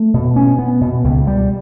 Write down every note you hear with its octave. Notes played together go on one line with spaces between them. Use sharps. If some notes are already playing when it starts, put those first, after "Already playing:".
Already playing: A3
B2
C#4
B3
B2
C#2
G3